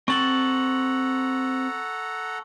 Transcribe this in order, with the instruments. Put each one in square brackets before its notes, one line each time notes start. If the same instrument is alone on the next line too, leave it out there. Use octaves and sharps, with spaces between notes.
[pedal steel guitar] C4 A5 [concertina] A4 F#5 A#5 [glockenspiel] C#6 F#7